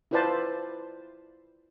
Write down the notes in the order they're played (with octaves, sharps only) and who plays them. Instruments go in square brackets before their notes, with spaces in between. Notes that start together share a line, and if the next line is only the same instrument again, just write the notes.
[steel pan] E4 F4 B4 C5 D5 A5